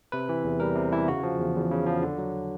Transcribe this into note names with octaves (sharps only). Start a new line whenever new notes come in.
C3 B4
E3
E2
G3 A#4
C3
E3 E4
C#3 F#4
F3
E2
E2
C#3
F3
D3
F#3